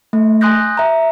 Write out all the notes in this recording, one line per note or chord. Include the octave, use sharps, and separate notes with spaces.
A3
G#5 C6 D#6 F#6 G6 A#6
E5 A#5